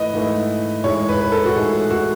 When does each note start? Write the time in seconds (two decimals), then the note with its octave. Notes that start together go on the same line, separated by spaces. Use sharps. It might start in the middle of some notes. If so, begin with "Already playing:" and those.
Already playing: G#2 E3 A3 E4 B4 D#5
0.13 G#2 E3 A3 E4
0.84 A2 G#3 D#4 C#5
1.09 B4
1.21 B4
1.32 A4
1.46 F#4
1.55 A2 G#3 D#4 G#4
1.91 F#4